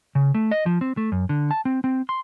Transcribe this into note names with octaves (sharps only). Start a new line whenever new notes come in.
C#3
A3
D#5
F3
C4
A3
F#2
D3
A5
C4
C4
C6